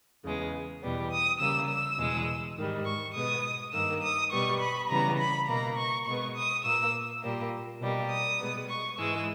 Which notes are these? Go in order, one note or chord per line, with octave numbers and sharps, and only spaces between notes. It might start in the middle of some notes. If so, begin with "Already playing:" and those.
E2 C#3 G#3 B3
E2 B2 G3 B3
D#6
C#3 G3 A#3 E6
E6
E2 B2 G#3
G#2 D#3 G3
C#6
B2 G#3 B3 D#6
G2 D#3 A#3 E6
D#6
B2 G3 B3 C#6
B5
C#3 E3 G3 B3 A#5
B5
B2 A#3 A#5
C#6
B2 G#3 B3 C#6
D#6
A#2 A#3 E6
A#2 G3 A#3
B2 G3 A#3
D#6
B2 G#3 B3
C#6
G#2 E3 G#3 E6